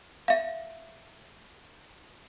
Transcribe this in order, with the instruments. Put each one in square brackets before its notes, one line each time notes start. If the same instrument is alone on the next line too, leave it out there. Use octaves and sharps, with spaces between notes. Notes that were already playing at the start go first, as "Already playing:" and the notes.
[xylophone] E5 F5